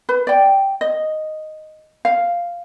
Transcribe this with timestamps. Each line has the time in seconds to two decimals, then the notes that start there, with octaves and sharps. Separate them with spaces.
0.09 B4
0.27 D5 G5
0.81 D#5
2.05 F5